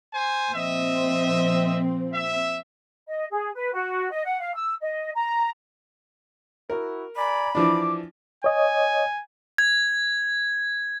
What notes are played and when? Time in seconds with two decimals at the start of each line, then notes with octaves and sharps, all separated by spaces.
0.12 C5 G#5
0.52 A#2 F3 C4 D#5 E5
2.10 E5
3.08 D#5
3.30 G#4
3.55 B4
3.73 F#4
4.11 D#5
4.25 F#5
4.40 F5
4.54 E6
4.82 D#5
5.14 A#5
6.70 E4 F#4 A#4
7.16 D5 G#5 A#5 B5
7.55 E3 F3 D4 D6
8.44 C#5 D#5 G#5
9.58 G#6